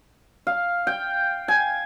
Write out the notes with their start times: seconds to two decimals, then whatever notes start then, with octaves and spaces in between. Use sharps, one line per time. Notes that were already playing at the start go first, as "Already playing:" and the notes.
0.47 F5
0.87 G5
1.48 G#5